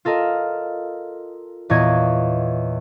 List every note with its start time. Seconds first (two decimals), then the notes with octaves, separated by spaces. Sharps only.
0.05 F4 A4 A#4 D#5
1.70 E2 A#2 C#5 D#5 G#6